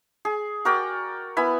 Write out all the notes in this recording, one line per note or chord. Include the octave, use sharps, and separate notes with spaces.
G#4
F#4 A#4 D5 G5
B3 E4 G#5 B5